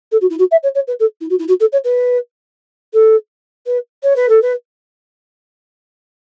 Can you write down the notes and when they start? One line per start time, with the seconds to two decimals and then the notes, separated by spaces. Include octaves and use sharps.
0.12 A4
0.21 F#4
0.30 E4
0.38 F#4
0.51 E5
0.63 C#5
0.75 C#5
0.87 B4
0.99 A4
1.21 E4
1.30 F#4
1.39 E4
1.48 F#4
1.60 A4
1.72 C#5
1.84 B4
2.93 A4
3.66 B4
4.03 C#5
4.16 B4
4.29 A4
4.42 B4